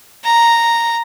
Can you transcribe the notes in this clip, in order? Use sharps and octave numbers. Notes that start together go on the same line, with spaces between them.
A#5